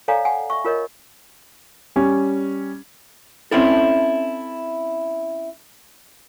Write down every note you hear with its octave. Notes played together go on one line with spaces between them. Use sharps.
A4 C#5 D5 F5 G#5 A#5
F#5 G#5
E5 C#6
F4 A#4 C#5 D#5
G3 C#4
C4 C#4 E4 A4